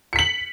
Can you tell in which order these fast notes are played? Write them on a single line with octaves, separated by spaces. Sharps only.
C#7 B6 F#7